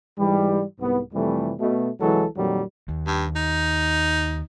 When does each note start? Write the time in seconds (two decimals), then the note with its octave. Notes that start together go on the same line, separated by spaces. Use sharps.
0.18 G#2 E3 G3
0.80 C2 G#2 B3
1.14 F2 C3 E3 G3 A3
1.59 B2 A3
2.01 C2 E3 F#3 G#3 A4
2.37 F2 A#2 D#3 F#3 G3
2.89 D#2
3.07 G2
3.36 D#4